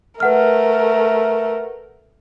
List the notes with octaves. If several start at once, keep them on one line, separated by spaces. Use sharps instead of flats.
A3 A#4 B4 F#5 F6